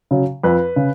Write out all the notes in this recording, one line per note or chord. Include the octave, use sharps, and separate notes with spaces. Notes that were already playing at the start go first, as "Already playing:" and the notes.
C#3 F#3
F2 B4
C#3